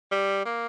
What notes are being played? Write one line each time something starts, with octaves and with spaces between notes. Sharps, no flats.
G3
A#3